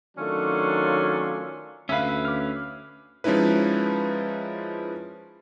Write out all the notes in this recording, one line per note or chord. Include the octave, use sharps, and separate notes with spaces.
D#3 F#3 A3 C#4 D4 F4
D2 C#4 B4 E5 F5
D6 F6
F3 G#3 C#4 D#4 E4 B4